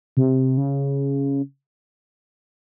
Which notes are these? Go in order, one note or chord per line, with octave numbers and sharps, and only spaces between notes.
C3
C#3